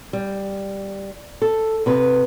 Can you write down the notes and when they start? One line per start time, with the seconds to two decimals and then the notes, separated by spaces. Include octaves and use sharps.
0.13 G3
1.42 A4
1.86 C3 B4